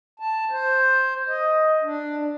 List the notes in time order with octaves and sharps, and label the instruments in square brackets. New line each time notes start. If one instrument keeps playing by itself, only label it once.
[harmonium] A5
C5
D#5
D4